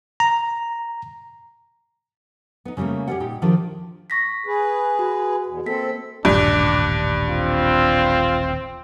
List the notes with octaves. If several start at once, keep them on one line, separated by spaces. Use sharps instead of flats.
A#5
B3 D#4
C#3 E3 G3 A3 A#3
G4 G#4 A#4 B4 D5 F#5
A#2 D#4 G4
D#3 F3 D4 D#4 G4 A#4
C#6 A#6 B6
G#4 B4
F#4
E2 B2
A#3 C4 A4 B6
D#1 A1 G2 D4
C4 F4